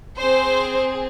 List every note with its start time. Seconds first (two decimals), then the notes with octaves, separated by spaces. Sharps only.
0.19 C4 G#4 C5